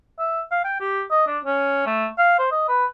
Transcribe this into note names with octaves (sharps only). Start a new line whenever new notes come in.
E5
F5
G5
G4
D#5
D4
C#4
A3
F5
C5
D#5
B4